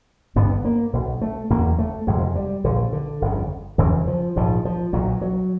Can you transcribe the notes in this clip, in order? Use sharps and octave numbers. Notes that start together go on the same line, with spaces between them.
G#1 G2 D3 B3
A#3
B1 B2
A3
F#1 E2 C#3 A#3
A3
F#1 F2 C3 G#3
G3
A#1 A#2 D3
D3
G1 F2 C#3
F1 F2 C#3 E3
F3
A#1 G#2 F3
F3
B1 A#2 F#3
F#3